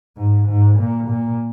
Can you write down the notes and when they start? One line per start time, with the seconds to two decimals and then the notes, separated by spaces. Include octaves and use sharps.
0.17 G#2
0.48 G#2
0.78 A#2
1.09 A#2